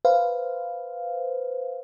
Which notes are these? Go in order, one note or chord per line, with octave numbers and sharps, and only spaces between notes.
B4 C5 F5